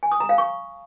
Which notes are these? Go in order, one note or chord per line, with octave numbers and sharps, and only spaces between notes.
G#5
D#6
A#5
F5
C#6